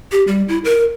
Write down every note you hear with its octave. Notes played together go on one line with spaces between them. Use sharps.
G4
G3
E4
A#4